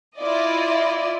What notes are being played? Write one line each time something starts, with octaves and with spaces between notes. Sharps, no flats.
E4 F4 D5 D#5